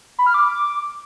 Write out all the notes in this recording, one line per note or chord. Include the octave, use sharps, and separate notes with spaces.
B5
F6
D6